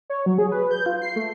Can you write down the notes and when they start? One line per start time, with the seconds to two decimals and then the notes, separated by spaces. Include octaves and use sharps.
0.10 C#5
0.26 F#3
0.38 G#4
0.52 B4
0.71 G6
0.86 F4
1.02 C7
1.16 A3